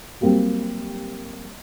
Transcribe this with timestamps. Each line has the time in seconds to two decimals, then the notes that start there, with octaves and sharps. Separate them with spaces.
0.21 F#3 G3 A#3 C4